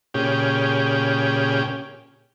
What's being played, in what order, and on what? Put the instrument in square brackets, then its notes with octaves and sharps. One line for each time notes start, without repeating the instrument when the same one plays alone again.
[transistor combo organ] A#2 C#3 C#4 G4 G#4 G5